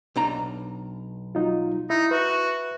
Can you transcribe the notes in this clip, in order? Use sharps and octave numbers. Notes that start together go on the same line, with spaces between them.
B1 D4 A#5
F#3 D#4 F4
D#4 E4
F#4 B4 E5